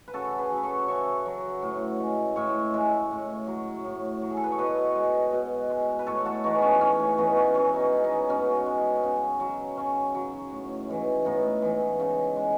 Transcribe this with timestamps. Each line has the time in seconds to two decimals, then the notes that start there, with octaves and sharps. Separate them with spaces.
0.08 B4
0.13 C#3 F#4 A4
0.38 G#4 B4
0.51 F#3
0.58 B4
0.63 A4 C#5
0.88 C#3 C#5 E5
1.26 F#3
1.62 A2
2.00 G#3
2.36 A2 C#5 E5
2.74 G#3
3.11 A2
3.47 F#3
3.85 A2
4.22 F#3
4.31 G#4
4.37 A4
4.44 B4
4.52 C#5
4.58 B2 B4 D#5
4.96 G#3
5.33 B2
5.70 G#3
5.99 B4
6.06 A2 A4 C#5
6.25 F#4 A4
6.44 E3 G#3 D#4 F#4
6.59 B3 C#4
6.80 A2 C#4
7.00 C#4
7.18 E3 G#3 B3 D#4
7.36 C#4 E4
7.54 B2 C#4
7.74 D#4
7.79 C#4
7.92 G#3
8.04 B3 D#4
8.29 B2 C#4
8.66 G#3
9.04 C#3
9.40 F#3
9.77 C#3 C#4
10.14 F#3
10.51 A2
10.88 E3 G#3
11.25 A2 B3 D#4
11.62 E3 G#3
12.00 C#3
12.36 G#3